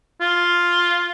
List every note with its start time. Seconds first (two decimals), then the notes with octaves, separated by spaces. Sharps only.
0.21 F4